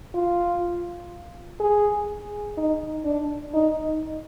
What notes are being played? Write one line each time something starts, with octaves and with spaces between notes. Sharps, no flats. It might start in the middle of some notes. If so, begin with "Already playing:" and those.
F4
G#4
D#4
D4
D#4